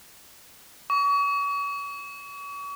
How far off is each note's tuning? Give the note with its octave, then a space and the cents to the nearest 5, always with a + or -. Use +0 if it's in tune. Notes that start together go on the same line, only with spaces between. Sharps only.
C#6 +40